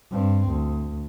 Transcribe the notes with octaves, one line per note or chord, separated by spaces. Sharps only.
G2 C4
D2